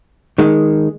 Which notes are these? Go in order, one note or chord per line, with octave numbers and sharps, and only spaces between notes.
D#3 G#3